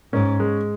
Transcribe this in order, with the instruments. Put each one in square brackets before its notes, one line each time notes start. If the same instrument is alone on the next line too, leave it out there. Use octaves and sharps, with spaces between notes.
[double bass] G#2 [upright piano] C#4
[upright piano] G#3